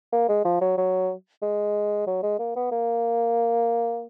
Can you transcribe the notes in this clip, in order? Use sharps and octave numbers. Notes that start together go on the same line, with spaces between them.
A#3
G#3
F3
F#3
F#3
G#3
F#3
G#3
A#3
B3
A#3